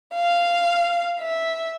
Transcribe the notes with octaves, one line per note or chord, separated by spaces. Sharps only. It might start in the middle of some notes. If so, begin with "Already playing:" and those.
F5
E5